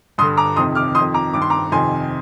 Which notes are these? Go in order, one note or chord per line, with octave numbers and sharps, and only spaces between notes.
G2 D3 C6 D#6
A#5 D6
F2 C3 D#3 C6 D#6
D6 F6
F2 D#3 C6 D#6
A#5 D6
G2 D#3 D6
C6
A#5 D6
F2 C3 D#3 G#5 C6